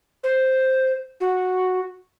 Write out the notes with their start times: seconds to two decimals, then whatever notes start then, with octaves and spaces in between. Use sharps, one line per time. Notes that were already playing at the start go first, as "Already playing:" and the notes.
0.24 C5
1.20 F#4